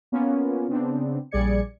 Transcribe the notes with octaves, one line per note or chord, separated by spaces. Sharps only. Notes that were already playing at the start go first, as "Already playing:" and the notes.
A#3 B3 C#4 F4
C#3 B3 C4 D4
A#1 G3 G#4 D5 G#6 C#7